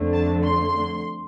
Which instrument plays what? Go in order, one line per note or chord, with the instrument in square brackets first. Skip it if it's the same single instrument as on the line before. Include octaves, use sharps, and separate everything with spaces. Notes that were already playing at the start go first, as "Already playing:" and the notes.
Already playing: [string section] F2 D3 A3
A5
C6